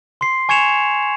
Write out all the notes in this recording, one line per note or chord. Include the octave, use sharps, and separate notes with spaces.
C6 C7
G#5 C#6 G#6 C#7 E7 F7